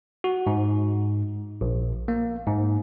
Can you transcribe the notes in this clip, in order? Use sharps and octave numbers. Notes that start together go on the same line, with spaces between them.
F#4
G#2
A#1
A#3
G#2